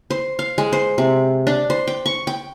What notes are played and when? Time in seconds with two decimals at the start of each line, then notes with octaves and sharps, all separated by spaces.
0.10 C5
0.39 F5
0.58 G#3
0.73 C5
0.98 C3
1.47 D4
1.70 C5
1.88 G5
2.06 C#6
2.27 G5